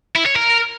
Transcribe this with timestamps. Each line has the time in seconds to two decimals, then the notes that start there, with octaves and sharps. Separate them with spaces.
0.15 E4
0.26 C#5
0.36 A#4